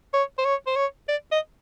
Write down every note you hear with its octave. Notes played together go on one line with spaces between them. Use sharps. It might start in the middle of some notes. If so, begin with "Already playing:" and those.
C#5
C5
C#5
C5
C#5
D5
D#5